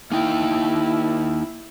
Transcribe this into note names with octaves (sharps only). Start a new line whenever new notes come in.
A#3 D#4 E4 G5